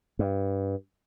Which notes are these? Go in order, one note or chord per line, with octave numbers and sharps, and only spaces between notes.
G2